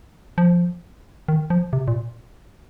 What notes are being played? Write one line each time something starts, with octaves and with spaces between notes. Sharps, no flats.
F3
D#3
F3
C3
A#2